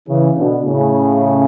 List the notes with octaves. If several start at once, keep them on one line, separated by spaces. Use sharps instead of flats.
C#3 E3
B2 D3
A2 C#3